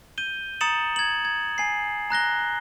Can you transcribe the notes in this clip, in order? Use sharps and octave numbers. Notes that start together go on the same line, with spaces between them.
G6 D#7 G7
A#5 D#6 A6 C#7 E7 F#7
G#6 F#7
G#6
G#5 C7
A#5 F#6 A#6 G7